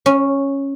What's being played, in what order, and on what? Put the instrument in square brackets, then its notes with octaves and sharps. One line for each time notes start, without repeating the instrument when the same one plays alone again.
[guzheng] C#4